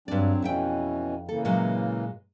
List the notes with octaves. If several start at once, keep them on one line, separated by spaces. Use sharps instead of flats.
G2 F#3 C4 D4 D5
F2 B2 E3 C#4 E4 G5
C#3 E3 A#3 A4
A#2 F#3 G#3